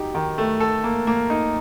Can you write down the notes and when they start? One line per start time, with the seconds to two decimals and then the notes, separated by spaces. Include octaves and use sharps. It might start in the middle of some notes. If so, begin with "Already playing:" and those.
Already playing: F#3 D#4 G4
0.15 D#3
0.38 A3
0.60 A4
0.84 A#3
1.07 A#3
1.30 D#4